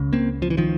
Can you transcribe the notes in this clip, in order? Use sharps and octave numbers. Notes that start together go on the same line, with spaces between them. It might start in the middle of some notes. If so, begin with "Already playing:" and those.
Already playing: C#2 C#3
A#3 C4
F3
E3
D#3 F3